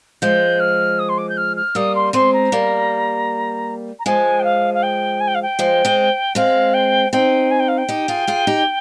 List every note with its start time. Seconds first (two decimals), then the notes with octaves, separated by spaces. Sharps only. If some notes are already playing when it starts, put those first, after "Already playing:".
0.22 F3 G#3 G6
0.60 F6
0.99 D#6
1.09 C6
1.18 D6
1.29 G6
1.37 F6
1.56 F6
1.75 G3 A#3 D#6
1.95 C6
2.13 G#3 C4 C6
2.33 A#5
2.52 G3 A#3
3.99 A#5
4.06 F3 G#3 G#5
4.39 G5
4.44 F5
4.74 F5
4.83 G5
5.20 G#5
5.27 G5
5.35 F5
5.42 G5
5.59 F3 G#3
5.85 G#3 C4
6.35 G#3 C4 F5
6.74 G5
7.12 C4 D#4 G5
7.51 G#5
7.60 G5
7.68 F5
7.78 G5
7.89 D#4 G4
8.08 F4 G#4
8.28 F4 G#4
8.47 D#4 G4